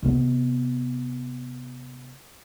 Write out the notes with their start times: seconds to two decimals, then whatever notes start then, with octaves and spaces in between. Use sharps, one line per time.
0.03 C3 B3